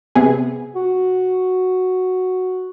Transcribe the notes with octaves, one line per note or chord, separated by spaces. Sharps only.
C3 B3 G#4
F#4